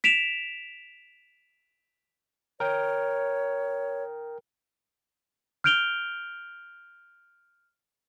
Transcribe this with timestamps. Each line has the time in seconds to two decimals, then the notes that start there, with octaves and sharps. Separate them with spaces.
0.04 B6 D7 E7 F7
2.60 A#4 C#5 G5
5.64 F6 G6 D7 F7 G7